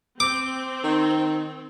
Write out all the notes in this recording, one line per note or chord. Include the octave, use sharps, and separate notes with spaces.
C4 D6
D#3